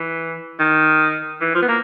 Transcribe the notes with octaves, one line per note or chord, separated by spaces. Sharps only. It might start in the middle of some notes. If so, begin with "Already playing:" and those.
Already playing: E3
D#3
E3
F3
B3
A#3